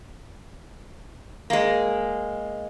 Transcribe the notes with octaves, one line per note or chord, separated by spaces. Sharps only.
G#3 A#3